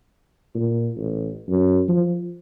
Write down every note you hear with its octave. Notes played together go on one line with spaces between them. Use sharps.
A#2
A1
F#2
F3